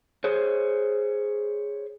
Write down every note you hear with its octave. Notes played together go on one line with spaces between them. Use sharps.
G#4 C5 C#5